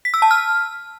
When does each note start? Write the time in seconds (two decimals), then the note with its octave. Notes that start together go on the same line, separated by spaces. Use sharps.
0.05 B6
0.14 E6
0.22 A5
0.31 F6